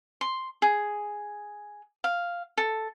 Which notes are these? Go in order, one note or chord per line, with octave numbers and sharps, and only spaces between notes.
C6
G#4
F5
A4